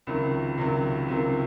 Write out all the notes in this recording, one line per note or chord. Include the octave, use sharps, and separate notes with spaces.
C#2 C3 D#3 F#3
C#2 C3 D#3 F#3
C#2 C3 D#3 F#3